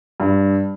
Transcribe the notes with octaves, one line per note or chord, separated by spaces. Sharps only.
G2